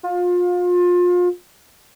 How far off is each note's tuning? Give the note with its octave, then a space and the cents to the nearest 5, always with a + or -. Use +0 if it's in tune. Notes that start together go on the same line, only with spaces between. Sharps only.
F4 +30